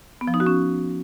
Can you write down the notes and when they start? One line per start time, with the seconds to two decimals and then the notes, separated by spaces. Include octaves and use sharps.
0.21 B3
0.28 F3
0.34 D#4
0.40 F#4
0.47 C#4